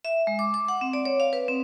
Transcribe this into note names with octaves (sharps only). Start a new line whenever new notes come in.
E5
G#3
D6
D6
F#5
C4
D5
C#5
F5
B4
C4